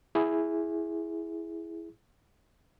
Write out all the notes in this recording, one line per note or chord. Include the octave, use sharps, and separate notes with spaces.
E4 G#4